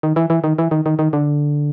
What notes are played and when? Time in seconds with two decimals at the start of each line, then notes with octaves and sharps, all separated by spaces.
0.03 D#3
0.16 E3
0.30 E3
0.44 D#3
0.58 E3
0.71 D#3
0.86 D#3
0.99 D#3
1.13 D3